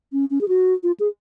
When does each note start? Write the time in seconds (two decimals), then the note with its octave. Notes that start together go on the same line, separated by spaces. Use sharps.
0.13 C#4
0.30 C#4
0.41 G#4
0.48 F#4
0.83 F4
1.00 G#4